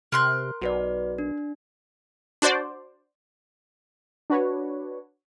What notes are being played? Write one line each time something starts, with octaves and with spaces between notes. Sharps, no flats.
C3 A#4 C6 F#6
B1 F#4 B4 D5
D4
D4 F#4 C5 D5
D4 F#4 B4 C#5